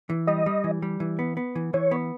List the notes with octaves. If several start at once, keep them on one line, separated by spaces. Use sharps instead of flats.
E3
G3 D#5
G3
E3
G3
E3
B3
B3
E3
E3 C#5
B3